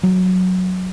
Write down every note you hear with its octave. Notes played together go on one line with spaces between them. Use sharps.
F#3